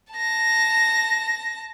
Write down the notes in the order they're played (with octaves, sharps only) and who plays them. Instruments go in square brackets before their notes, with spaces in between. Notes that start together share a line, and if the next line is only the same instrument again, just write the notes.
[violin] A5 A#6